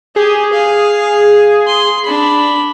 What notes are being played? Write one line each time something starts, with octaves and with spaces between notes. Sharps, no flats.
G4 G#4
F5
C6
D4 B5